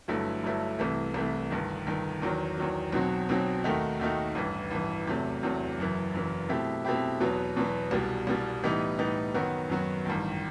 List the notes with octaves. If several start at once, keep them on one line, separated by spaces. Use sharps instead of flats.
G1 G2 F#3 A3 E4
G1 G2 F#3 A3 E4
C2 C3 E3 A3
C2 C3 E3 A3
G1 G2 D#3
G1 G2 D#3
E2 D#3 F#3
E2 D#3 F#3
B1 B2 F#3 C4 F#4
B1 B2 F#3 C4 F#4
D#2 D#3 A3 D#4 F#4
D#2 D#3 A3 D#4 F#4
A1 G2 E3
A1 G2 E3
E2 C3 F#3 A3
E2 C3 F#3 A3
F#1 F#2 E3
F#1 F#2 E3
B2 A3 C4 E4 G4
B2 A3 C4 E4 G4
E2 B2 F#3 B3
E2 B2 F#3 B3
C2 B2 G3
C2 B2 G3
A2 E3 G3 B3 D#4
A2 E3 G3 B3 D#4
F#2 D#3 F#3 B3 F#4
F#2 D#3 F#3 B3 F#4
A1 G2 D#3